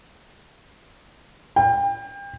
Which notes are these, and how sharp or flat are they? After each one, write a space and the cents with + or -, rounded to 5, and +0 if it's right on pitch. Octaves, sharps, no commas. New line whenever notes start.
G5 +30